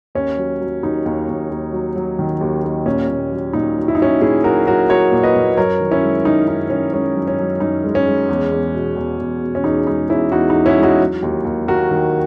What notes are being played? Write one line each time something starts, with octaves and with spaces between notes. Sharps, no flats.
D#2 C#4
F#3
F#3
D#2 D#4
D#2
D#2
D#2
F#3
F#3
D#3
D#2
D#2
A#2 C#4
A#2
F#3
A#2 D#4
F#3
E4
D#4
F#3 C#4 E4
A#2 E4 G#4
F#3 F#4 A#4
F#3 F#4 A#4
F#3 A#4 C#5
A#2
B4 D#5
A#2
F#2 A#4 C#5
D#3
C#4 E4
G#3
D#3 D#4
F#2 D#4
D#3 C#4
G#3 C#4
F#2
C#4
F#2
F#2 D#4
G#3
C#4
G#3
E2
E2
B2
E2
E2
B2
C#4
E2 D#4
G#3 D#4
E2 C#4 E4
E2 D#4 F#4
E2 D#4
C#4 E4
G#3
D#4 F#4
F#3
D#2
D#2
D#2 F#4 A#4
D#3